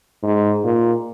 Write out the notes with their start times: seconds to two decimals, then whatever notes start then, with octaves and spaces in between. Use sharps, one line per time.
0.23 G#2
0.64 A#2